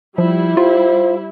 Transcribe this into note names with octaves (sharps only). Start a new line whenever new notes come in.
F3 G3 E4
F4 C5